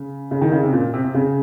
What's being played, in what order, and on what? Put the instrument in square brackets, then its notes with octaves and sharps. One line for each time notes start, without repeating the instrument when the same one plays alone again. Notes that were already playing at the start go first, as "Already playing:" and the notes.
Already playing: [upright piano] C#3
C#3
D#3
C#3
C3
A#2
C3
C3
C#3